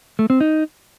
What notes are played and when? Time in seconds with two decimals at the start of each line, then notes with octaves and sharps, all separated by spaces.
0.19 A3
0.30 C4
0.41 D#4